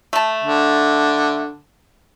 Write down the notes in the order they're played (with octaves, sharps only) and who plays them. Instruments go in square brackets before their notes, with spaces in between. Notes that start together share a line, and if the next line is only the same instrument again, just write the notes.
[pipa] A3 A5
[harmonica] D3